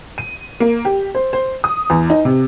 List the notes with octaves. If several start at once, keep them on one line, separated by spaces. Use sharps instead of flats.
D#7
A#3
G4
C5
C5
D#6
E2
D#4
C3